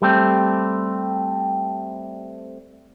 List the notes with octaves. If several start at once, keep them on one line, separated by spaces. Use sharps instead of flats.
G3 A3 C4